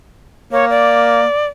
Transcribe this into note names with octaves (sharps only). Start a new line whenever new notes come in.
A#3 C#5
D5